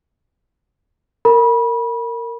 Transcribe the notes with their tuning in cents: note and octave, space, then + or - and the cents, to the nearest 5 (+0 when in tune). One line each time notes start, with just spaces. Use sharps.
A#4 -20 B5 -30